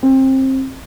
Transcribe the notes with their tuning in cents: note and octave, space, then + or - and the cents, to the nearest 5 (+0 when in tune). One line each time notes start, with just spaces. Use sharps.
C4 +25